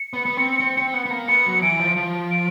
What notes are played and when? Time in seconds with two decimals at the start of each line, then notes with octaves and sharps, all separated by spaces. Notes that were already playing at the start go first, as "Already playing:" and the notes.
Already playing: C#7
0.13 B3
0.26 B3
0.37 C4
0.60 C4
0.77 C4
0.94 B3
1.06 B3
1.10 A#3
1.28 B3 C#7
1.45 F#3
1.62 E3 D7
1.80 F3
1.97 F3
2.31 D7